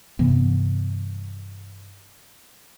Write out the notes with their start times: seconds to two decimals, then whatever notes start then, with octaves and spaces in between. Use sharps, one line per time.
0.19 G2 C3 E3 B3